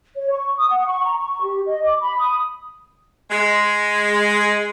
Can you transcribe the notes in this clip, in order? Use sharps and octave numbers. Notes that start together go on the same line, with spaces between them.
C#5
C#6
D#6
F#5
C#6
A#5
C#6
G4
D#5
D6
B5
D#6
G#3